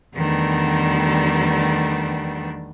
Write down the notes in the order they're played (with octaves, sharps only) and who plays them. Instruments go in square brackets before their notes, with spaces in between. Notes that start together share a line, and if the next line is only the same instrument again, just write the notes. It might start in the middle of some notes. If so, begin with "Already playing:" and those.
[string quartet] E2 D#3 G3 A3 B3 D4